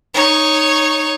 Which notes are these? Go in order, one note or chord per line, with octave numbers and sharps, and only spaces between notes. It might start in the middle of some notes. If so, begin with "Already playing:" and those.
D#4 C#5